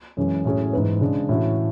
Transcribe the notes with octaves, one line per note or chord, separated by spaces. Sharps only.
F#2 E3 G#3 C#4
A2 F#3 C#4 G#4
G#2 E3 B3 E4 B4
C#3 G#3 D4
A2 E3 A3 C#4 F#4